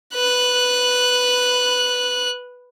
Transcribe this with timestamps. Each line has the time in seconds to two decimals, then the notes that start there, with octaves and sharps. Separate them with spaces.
0.14 B4 F#6